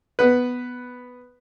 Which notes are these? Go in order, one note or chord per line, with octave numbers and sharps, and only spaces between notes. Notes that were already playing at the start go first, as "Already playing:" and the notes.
B3 B4